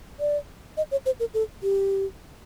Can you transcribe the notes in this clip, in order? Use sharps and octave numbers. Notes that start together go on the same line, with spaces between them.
D5
D#5
C#5
C5
A#4
A4
G4